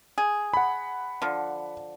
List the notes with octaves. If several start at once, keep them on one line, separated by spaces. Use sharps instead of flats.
G#4
F#5 B5
D3 F3